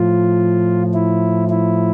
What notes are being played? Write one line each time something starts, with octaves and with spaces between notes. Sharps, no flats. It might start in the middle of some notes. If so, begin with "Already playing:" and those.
Already playing: A2 F3 F4
E4
E4